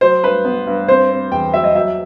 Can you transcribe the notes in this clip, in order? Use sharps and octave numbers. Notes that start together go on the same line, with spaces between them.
F#3 C5
G2 B4
B3
G2
C4 C5
C4
E2 G5
F#3 E5
D#5
F#3 E5